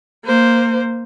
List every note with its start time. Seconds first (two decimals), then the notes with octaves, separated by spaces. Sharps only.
0.25 A#3 C5